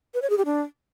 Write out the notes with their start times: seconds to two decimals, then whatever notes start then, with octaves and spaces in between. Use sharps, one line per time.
0.14 B4
0.22 C#5
0.30 G#4
0.38 G4
0.45 D4